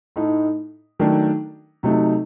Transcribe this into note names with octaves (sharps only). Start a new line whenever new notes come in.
A2 A3 D#4
D#3 F#3 A3 D4
C3 F#3 A3 D#4